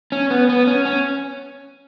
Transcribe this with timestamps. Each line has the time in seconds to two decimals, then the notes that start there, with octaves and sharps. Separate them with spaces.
0.12 C#4
0.30 B3
0.49 B3
0.67 C#4
0.85 C#4